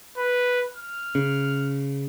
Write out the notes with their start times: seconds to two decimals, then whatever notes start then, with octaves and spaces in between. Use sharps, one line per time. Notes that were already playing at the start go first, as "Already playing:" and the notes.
0.18 B4
0.76 F6
1.15 C#3